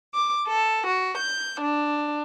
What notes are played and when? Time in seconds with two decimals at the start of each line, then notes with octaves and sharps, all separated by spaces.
0.13 D6
0.46 A4
0.86 F#4
1.17 G6
1.60 D4